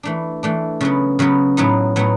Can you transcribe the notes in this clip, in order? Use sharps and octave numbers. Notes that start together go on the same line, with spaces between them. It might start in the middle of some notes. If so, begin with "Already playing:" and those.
E3 A3 D4
E3 A3 D4
C#3 F#3 B3
C#3 F#3 B3
A2 F#3 B3 D#4
A2 F#3 B3 D#4